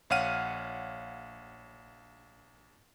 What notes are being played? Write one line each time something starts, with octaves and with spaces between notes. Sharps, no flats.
A#1 C#5 F5 F#5 F6 D#7